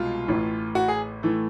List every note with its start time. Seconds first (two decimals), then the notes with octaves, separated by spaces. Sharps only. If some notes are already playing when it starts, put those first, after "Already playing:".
Already playing: C2 B2 G#3 F4
0.28 A1 A2 E3
0.75 F#4
0.88 G#4
1.23 A2 E3 A3